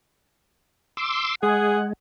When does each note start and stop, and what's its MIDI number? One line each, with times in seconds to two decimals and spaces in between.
0.97 1.35 84
0.97 1.35 86
0.97 1.35 88
1.43 1.93 56
1.43 1.78 68
1.43 1.86 78